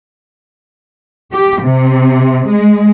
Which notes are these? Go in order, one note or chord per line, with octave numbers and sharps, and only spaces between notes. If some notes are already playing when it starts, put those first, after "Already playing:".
G4
C3
G#3